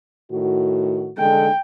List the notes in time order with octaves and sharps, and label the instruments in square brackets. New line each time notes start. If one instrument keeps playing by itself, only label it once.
[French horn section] A2 D#3 F#4
[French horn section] D3 G#3 A4 [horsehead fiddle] G5